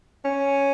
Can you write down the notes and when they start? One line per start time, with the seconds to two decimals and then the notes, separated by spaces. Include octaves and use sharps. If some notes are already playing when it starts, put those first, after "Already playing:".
0.25 C#4